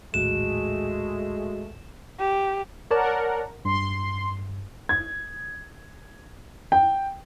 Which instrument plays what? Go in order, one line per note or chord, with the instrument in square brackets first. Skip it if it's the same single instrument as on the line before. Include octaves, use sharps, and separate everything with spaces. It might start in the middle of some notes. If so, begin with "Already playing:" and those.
[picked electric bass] A#1 D#2 A2 [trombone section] G#3 A3 [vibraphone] F#4 [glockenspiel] E7
[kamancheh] G4
[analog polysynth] A#4 F#5 [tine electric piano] C#5 D5 A5
[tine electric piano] G2 [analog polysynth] C6
[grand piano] G#6
G5